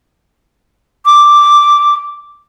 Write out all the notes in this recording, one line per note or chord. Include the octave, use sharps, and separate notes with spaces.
D6